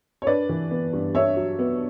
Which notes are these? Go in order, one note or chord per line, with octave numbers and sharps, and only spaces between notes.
C#5
D4 B4 D5
E3
B3
G2
D4 C#5 E5
F#3
B3